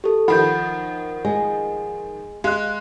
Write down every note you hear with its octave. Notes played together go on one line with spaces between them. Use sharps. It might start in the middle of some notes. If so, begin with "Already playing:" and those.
G4 A4
D#3 F3 F#5 B5 G6
G#3
G#3 F5 F#6